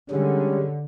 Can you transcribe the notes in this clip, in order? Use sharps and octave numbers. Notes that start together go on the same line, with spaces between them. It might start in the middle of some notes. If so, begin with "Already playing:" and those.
D3 G3 G#3 C#4